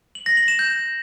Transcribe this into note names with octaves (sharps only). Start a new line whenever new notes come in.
F#7
A#6
F#7
E7
G6